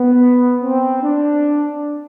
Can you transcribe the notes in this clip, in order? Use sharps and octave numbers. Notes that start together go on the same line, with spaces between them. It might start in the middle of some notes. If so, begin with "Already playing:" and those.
Already playing: B3
C4
D4